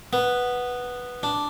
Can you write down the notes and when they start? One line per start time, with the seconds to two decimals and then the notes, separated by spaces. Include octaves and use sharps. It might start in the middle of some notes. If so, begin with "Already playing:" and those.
0.13 B3
1.23 D4